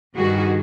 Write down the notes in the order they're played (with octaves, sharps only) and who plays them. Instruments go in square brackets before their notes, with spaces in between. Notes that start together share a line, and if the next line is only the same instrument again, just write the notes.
[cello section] G2 D#3 G3 F#4 G#4